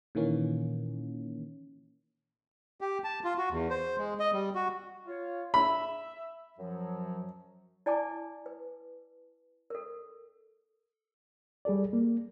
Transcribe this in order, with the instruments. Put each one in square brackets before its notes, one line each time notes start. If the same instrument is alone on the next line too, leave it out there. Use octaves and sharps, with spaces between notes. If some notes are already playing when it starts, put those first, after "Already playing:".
[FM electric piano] A#2 D#3 E3 A#3 C#4
[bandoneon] G4
A5
F4
F#4
E2
C5
G#3
D#5
G3
F#4
[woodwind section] F4 C#5
[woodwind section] E5 [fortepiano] B5
[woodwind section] F#2 F3 F#3
[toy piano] E4 D5 G#5 A5 D6
B4
A4 A#4
[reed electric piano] G3 G#4 A4 D5
A#3